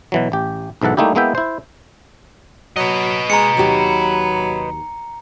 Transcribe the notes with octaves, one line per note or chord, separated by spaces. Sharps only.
B2 E3 F#3
A1 G4
B1 G#2 E3 A4 F#5
G3 A3 A#3 D#4 E4 G4
G#3 A#3 B3 E4 E5 G5
E4 C5
F#3 B4 D#5
G#3 A#5 C#7
D#2 F#3 G4